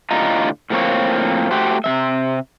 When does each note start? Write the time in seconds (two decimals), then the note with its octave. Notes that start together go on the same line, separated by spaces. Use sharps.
0.11 A2 D3 F4 G4 D#5 A#5
0.70 A2 F3 A#3 C4 C#5
1.51 A3 F#4 G4 C5
1.84 C3 F3 E5